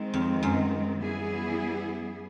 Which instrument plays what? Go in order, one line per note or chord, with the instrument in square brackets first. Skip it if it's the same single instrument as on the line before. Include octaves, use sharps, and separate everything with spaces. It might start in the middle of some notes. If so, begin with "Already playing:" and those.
Already playing: [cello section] D#3 G#3 C4
[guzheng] F2
F#2
[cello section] E3 G3 B3 E4 G#4